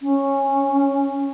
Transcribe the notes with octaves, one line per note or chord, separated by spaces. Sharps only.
C#4